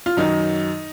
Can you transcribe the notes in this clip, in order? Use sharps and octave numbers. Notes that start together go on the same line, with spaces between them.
F4
F#2 D#3 F#3 D#4